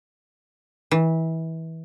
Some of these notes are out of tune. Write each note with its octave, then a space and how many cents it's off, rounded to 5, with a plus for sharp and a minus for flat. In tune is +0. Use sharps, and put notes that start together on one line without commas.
E3 -25